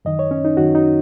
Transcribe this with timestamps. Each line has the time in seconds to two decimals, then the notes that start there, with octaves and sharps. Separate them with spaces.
0.05 F#2 D#3 D#5
0.19 C#5
0.31 C#4
0.45 D#4
0.57 F#2 D#3 F#4
0.75 D#4